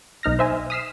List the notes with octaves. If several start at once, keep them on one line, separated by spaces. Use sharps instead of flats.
B1 D#4 F6 A#6
C5 E5 G#5
D#6 F6 B6 C7 E7